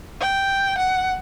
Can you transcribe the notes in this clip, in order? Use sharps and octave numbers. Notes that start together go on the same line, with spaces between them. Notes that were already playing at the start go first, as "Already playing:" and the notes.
G5
F#5